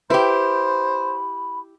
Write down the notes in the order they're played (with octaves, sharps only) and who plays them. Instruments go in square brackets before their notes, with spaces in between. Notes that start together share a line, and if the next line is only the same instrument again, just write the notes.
[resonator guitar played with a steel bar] E4 G4 [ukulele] B4 [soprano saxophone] C5 [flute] B5